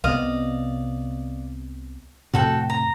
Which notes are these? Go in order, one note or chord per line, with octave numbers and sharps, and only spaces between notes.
C2 C3 B3 D5 D#5 F5
F2 A2 C3 F#4 A4 G5
A#5